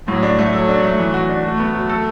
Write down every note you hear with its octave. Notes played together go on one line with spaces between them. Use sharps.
A2 F#3
D4
A3
F#3 A4
D4
A3
E3
F#4
D4
A3 F#4
B3
F#3
A4